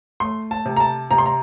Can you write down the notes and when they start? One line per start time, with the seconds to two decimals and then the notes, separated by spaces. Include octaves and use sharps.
0.20 A3 C6
0.51 A5
0.66 C3
0.76 A#5
0.80 A5
1.11 C3 A#5
1.18 C6
1.26 A#5